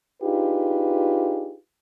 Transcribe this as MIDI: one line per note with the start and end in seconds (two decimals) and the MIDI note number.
0.22 1.56 62
0.22 1.56 63
0.22 1.56 65
0.22 1.56 67
0.22 1.56 68
0.22 1.56 71